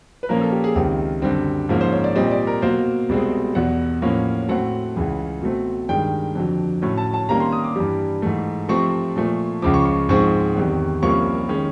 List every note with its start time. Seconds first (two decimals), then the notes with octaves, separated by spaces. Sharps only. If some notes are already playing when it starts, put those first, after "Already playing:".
0.23 B4
0.29 A#2 F3 A#3 C#4 A#4
0.41 A4
0.52 G4
0.64 G#4
0.75 C#2 C3 D#3
1.22 F#2 D3 G3 C4
1.69 G#2 F3 A#3 C#4
1.81 C5
1.92 C#5
2.04 D5
2.15 A#2 G3 C4 D#5
2.31 D5
2.47 A#4
2.62 B2 F#3 A#3 C5
3.09 C2 B2 G#3 C4
3.55 E2 B2 F#3 F#5
4.02 A2 F3 A#3 C#4
4.49 A2 F#3 A3 C4 F#5
4.96 C#2 C#3 E3
5.42 B2 F#3 A3 C4
5.89 G2 D#3 G#3 G5
6.35 F2 D3 F#3
6.82 A2 F#3 A3 C#4
6.98 A5
7.14 A5
7.29 C3 D#3 G3 A#3 C#4 A#5
7.40 C6
7.52 D#6
7.64 D6
7.76 G2 E3 G3
8.22 G#2 E3 A3
8.69 C3 F3 A3 C4 C#6
9.16 A#2 F3 A3
9.62 C#2 C#3 F3 D6
9.74 C#6
9.86 C#6
10.09 G#2 F3 G#3 C4 C#6
10.56 E2 C3 D#3
11.02 C2 C3 F3 A#3 C#4 C#6
11.49 D#3 G#3 C#4